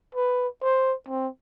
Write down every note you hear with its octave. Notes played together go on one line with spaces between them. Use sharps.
B4
C5
C4